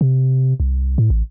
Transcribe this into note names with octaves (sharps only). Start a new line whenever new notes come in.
C3
C2
A2
A1